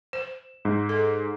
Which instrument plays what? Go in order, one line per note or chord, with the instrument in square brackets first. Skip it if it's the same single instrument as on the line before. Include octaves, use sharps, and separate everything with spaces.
[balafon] C5 [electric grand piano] E7
[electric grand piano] G#2
[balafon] A4